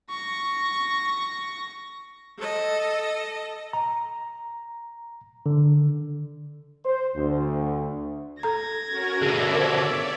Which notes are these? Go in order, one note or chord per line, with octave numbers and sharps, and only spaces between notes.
C#6 A#6
A4 D#5
A#5
D3
C5
D2
A4 A#5 G#6 A#6
C#4 F#4 A#4
B2 D3 G#4 C#5 D5 E5
A#4 C5